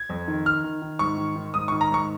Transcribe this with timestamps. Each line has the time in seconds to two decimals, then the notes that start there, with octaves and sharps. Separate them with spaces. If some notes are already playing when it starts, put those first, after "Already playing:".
Already playing: G#6
0.09 F2
0.28 D#3
0.45 D#3 F6
0.64 D#3
0.82 D#3
0.99 G#2 C#6
1.17 D#3
1.36 D#3
1.54 G#2 D#6
1.68 D#3 C#6
1.81 A#5
1.91 G#2 C#6